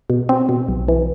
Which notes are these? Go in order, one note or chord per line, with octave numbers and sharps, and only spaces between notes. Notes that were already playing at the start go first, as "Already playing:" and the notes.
B2
C4
B2
B1
E3